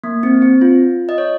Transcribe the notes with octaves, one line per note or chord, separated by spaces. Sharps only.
A#3
C4
C4
F4
D#5
C#5